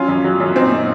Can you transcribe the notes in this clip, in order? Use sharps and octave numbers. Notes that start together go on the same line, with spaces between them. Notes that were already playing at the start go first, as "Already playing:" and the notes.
Already playing: F2 F#3 C#4 F4
F#2
F#3
F#2
A#2 C4 D#4
A#2